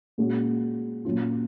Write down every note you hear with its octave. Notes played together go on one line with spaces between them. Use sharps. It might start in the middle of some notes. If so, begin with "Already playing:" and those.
A#2 G#3 C#4 F#4
A#2 F#3 C#4 F4